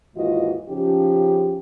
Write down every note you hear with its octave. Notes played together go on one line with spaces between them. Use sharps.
D#2 G#2 E3 F4 F#4 D#5
C#3 F3 C#4 D#4 G4